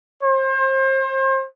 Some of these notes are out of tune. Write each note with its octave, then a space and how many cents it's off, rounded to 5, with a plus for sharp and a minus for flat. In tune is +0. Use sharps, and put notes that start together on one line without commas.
C5 +35